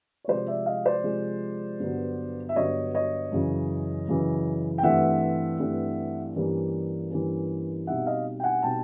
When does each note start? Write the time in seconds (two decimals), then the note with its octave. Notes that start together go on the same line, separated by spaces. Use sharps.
0.24 C#5
0.28 C3 F3 G#3 C5 D5
0.47 D5 E5
0.66 D#5 F5
0.85 C5 D5
1.04 C3 F3 G#3
1.80 G2 D3 F#3 B3
2.49 E5
2.56 G2 D3 F#3 B3 C#5 D#5
2.95 C#5 D#5
3.32 F#2 C#3 E3
4.08 F#2 C#3 E3
4.78 G5
4.83 G2 E3 A3 C4 E5 F#5
5.59 G2 E3 A3 C4
6.36 G2 E3 G3 A#3 C#4
7.11 G2 E3 G3 A#3 C#4
7.87 B2 G3 C4 D#4 E5 F#5
8.06 D#5 F5
8.40 G5
8.44 F#5 G#5
8.63 B2 G3 C4 D#4 G5 A5